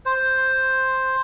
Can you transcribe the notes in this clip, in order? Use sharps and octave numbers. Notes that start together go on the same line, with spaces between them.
C5